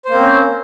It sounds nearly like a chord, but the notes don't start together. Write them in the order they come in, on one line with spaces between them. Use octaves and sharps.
C5 A#3 C4 C#4